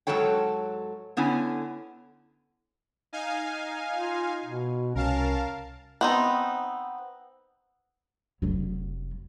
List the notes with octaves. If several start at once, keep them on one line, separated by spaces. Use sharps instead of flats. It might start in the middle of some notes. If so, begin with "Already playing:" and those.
G#2 F#3 A#3 A4 C#5 G5
D3 B3 C#4 E4 G#5
D#4 F5 G#5
F4
B2
C2 C#4 A#4 F5 A5
B3 C4 D#4
F1 F#3